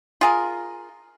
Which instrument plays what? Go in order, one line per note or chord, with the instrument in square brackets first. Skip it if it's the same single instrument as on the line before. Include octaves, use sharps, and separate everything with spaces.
[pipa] F4 G#4 A#4